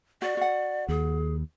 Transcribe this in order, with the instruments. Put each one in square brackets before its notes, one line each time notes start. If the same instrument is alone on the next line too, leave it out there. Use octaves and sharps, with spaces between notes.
[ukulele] F#4 [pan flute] D5
[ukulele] F#4 F#5
[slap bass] D#2 [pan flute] G#4